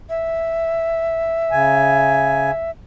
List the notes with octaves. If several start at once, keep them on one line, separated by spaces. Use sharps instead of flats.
E5
C#3 G#5